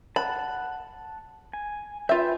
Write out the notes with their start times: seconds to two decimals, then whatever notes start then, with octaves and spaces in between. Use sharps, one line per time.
0.16 F#5 A5 B5
1.53 G#5
2.09 F4 B4 E5 G5